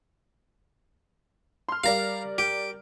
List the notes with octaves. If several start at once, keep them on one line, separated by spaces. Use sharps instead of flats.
C6 F6
G3 A#4 D5 F5 A#5
G4